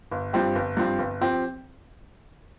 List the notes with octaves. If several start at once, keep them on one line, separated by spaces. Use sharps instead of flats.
G1
G2 F3 C4 G4
G1
G2 F3 C4 G4
G1
F3 C4 G4